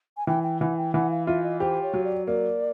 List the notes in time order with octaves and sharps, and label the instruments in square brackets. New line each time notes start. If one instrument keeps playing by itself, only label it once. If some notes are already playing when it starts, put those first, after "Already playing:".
[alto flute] G#5
[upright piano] E3 [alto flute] G5
[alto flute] G5
[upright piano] E3 [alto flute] F#5
[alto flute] G5
[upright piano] E3 [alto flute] F#5
[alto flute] F5
[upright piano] F4 [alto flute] E5
[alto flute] D#5
[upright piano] G4 [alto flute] C5
[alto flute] C#5
[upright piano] F#3
[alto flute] D5
[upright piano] A#3 [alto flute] D5